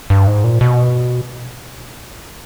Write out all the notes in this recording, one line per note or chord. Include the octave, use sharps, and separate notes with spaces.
G2
G#2
A#2
B2